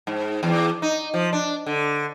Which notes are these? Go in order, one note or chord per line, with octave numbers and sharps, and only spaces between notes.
G#2
E2
D#4
F3
D4
D3